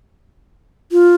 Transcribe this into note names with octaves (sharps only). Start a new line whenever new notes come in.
F4